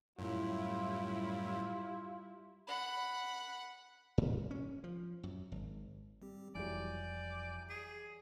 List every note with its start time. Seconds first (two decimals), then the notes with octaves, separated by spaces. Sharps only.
0.19 F#2 A2 G3 E4 F4
2.67 F#5 B5
4.18 G#2
4.51 C#4
4.84 F3
5.23 F#2
5.52 G#1
6.22 G3 C4 G4
6.55 F1 F2 E3 F#3 G3 D5 G#5 G6
7.70 G#4